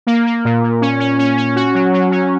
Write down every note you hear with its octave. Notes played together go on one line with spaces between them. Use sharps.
A#3
A#3
A#2
A#2
C#4
C#4
C#4
C#4
F#4
F#3
F#3
C#4